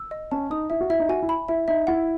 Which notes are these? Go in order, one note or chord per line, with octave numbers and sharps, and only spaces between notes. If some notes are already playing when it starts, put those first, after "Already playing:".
Already playing: E6
D#5
C#4 A5
D#4 D#6
E4 E5
F#4
E4 E5
D#4
F#4 G#5
E4
B5
E4 E5
D#4 E5
E4 F#5